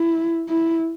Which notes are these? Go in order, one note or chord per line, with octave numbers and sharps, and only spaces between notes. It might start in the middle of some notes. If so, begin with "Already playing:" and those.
Already playing: E4
E4